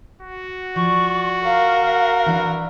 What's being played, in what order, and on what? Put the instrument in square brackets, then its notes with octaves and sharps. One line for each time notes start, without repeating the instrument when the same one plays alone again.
[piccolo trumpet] F#4
[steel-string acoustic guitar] F3 [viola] D5 [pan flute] C#6
[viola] A#4 [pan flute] F5
[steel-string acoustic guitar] E3 D4